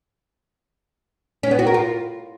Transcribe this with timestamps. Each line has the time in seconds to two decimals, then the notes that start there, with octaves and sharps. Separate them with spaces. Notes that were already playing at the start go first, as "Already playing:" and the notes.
1.43 C#4
1.51 B3
1.59 F#4
1.67 A#4
1.74 F4